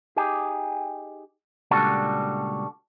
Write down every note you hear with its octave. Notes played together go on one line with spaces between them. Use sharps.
D#4 G4 G#4
C#2 A#2 G3 D4 F#4 A4